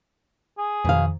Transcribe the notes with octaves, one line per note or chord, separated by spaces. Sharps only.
G#4
F2 B2 D#3 F5